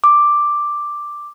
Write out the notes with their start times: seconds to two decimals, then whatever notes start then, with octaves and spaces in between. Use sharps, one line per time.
0.04 D6